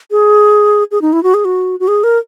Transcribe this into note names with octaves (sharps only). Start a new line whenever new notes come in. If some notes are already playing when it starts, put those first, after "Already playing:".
G#4
G#4
D#4
E4
F#4
G#4
F#4
F#4
G#4
A#4